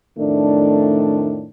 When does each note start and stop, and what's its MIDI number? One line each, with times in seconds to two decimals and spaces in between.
0.18 1.47 41
0.18 1.47 45
0.18 1.47 51
0.18 1.47 57
0.18 1.47 62